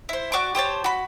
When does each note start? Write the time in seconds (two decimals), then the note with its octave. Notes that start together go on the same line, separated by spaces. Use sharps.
0.09 E4 C5
0.32 F#4 D5 C#6 D6
0.55 G4 C5 C#5 A5
0.84 F#4 B5